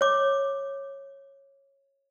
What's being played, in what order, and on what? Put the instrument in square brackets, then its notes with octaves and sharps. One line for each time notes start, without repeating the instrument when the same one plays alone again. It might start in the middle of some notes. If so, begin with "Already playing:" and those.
[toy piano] C#5 D6